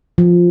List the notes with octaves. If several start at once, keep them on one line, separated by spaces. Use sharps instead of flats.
F3